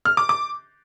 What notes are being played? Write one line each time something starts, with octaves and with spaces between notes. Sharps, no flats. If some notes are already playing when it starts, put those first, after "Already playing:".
F6
D6
D6